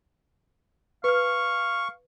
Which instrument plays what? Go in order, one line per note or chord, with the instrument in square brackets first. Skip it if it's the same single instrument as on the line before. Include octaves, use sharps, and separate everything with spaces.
[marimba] B4 F6 [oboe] F5 [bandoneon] C#6